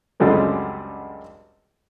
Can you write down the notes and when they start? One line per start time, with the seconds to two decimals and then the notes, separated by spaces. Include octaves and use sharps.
0.20 C#2 F#2 D3 G3 G#3 C4